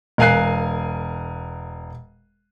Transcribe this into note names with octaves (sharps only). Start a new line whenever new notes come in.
E1 A#4 F5 G#5 F#6 C7